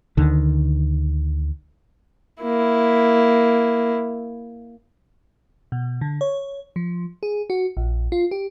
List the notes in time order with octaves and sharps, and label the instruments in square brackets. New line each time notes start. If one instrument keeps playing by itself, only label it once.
[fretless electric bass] D2 D3 D#3
[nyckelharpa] A#3 E4
[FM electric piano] B2
D3
C#5
F3
G#4
F#4
A#1
F4
G4